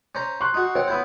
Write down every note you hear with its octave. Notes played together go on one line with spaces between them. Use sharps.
C#4 C5 A#5
C6 C#6 F#6
D#4 F#4
C4 C#5 F#5
B3 E4 C5